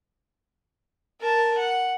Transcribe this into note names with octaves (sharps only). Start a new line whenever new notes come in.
A#4 A5
F#5